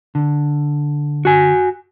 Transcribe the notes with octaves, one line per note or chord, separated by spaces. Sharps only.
D3
F#4 G#5